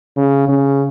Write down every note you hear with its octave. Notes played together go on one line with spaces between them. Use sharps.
C#3
C#3